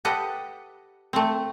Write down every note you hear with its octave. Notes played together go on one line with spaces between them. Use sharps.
G4 A4 B4 D#5 F#5
A3 C4